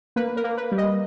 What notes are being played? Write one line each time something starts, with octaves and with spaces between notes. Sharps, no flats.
A#3 B4
A#4
A#3
B4
G3
D#5